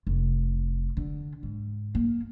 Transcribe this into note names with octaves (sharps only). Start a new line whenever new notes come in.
F1
D3
G#2
A#3